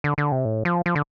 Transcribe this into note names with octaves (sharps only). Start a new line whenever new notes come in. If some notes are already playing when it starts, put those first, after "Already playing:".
D3
D3
C3
A2
F3
F3
D3